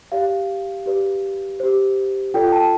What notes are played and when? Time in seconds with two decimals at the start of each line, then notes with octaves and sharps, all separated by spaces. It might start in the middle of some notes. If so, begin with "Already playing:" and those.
0.12 G4 D5 F5
0.86 G4 B4 D5
1.60 G4 C5
2.34 F4 A4 D5 G5
2.48 G5
2.52 A5